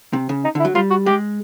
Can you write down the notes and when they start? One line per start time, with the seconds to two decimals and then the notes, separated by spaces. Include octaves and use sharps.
0.13 C3
0.29 C#3
0.44 D#4
0.55 D3 E4
0.65 F#3
0.75 G3 F4
0.90 F#4
1.06 G#3 G4